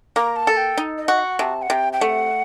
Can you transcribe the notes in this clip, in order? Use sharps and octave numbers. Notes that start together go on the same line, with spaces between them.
A#3 A#5
A5
A4
G5
D#4
D#5
F#4
F#5
C3 A5
F#5
C3 G5
G5
A3 F#5